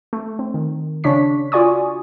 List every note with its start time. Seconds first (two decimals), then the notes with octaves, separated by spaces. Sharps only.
0.13 A3
0.39 C4
0.54 D#3
1.04 C#3 D4 C#5 C#6 B6
1.52 F4 F#4 D5 G#5 C#6 D#6